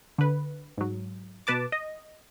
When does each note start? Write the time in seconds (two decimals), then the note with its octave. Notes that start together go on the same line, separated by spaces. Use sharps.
0.18 D3 B4
0.78 G#2 F#3
1.47 B2 B4 A5 D6
1.72 D#5